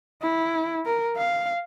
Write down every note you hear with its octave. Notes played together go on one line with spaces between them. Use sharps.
E4
A#4
F5